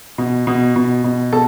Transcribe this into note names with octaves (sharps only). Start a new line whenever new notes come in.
B2
B2
B2
B2
B2 A4